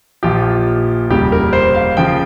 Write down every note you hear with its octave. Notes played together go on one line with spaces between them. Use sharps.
A#1 A#2 F3 G4
F1 D#2 C#3 G3 G4
A#4
C5
F5
C#3 F3 G5